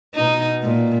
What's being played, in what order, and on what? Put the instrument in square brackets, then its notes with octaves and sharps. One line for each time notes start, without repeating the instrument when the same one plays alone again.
[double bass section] B2 [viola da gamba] D#4
[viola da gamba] A#2